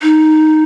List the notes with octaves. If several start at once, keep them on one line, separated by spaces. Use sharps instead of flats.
D#4